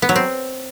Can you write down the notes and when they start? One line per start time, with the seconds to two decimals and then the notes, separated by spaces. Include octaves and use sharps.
0.02 B3
0.09 F#3
0.16 C4